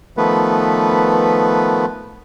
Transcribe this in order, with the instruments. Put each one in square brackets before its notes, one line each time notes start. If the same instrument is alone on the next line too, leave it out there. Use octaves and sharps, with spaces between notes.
[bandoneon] D#3 F3 A3 B3 B4